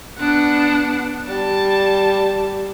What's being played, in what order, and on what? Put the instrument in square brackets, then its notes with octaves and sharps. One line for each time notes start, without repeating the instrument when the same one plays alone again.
[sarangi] B3 [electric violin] D4 F#5
[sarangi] G3 [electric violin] A5